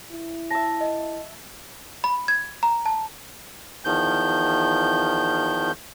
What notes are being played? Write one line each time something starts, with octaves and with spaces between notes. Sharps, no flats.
E4
E5 A5 A#6
D#5
B5
G#6
A#5
A5
E2 D#3 F3 G6